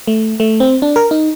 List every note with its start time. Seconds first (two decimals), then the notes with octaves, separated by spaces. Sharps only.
0.07 A3
0.40 A3
0.60 C4
0.82 D4
0.96 A#4
1.11 D#4